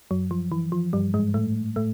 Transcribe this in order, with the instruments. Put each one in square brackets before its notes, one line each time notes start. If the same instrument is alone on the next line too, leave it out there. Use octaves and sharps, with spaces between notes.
[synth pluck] F#2 F#3
F3
E3
F3
G2 G3
G#2 G#3
A2 A3
A2 A3